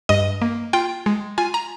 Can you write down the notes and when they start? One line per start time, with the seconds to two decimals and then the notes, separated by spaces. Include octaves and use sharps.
0.09 G2 D#5
0.42 A#3
0.73 F4 G5
1.06 G#3
1.38 F4 G#5
1.54 A#5